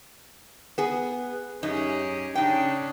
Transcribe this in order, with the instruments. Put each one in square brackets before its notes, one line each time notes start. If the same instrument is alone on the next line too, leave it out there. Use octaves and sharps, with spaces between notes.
[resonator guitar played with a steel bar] B3 G#4
[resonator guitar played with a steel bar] F#2 D#4 [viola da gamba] C#4 G4 G#4
[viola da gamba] C#3 D4 [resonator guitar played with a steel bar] D#4 G5